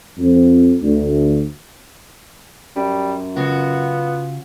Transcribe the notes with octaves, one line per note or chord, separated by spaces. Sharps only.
F2
D2
F#2 G3
C#3 B3 F4 F#4